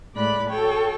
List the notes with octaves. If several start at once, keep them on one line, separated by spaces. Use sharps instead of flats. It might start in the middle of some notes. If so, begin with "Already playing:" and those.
A2 G#3 D5 B5 F#6
F#4 A4 C#5 G5